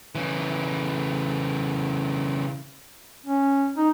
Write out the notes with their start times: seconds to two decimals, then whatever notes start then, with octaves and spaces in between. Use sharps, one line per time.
0.15 C#3 E3
3.26 C#4
3.77 D#4